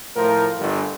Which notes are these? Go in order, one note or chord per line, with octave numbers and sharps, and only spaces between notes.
A2 F3 A#4
G1